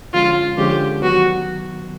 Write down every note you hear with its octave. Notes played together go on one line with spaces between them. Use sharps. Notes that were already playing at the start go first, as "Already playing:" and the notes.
D3 F3 G#3 C#4 F4
D3 F3 G#3 C#4 G4
D#3 F#3 B3 F#4